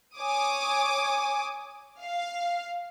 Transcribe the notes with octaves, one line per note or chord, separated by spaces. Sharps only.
C#5 G#5 D6 D#6
F5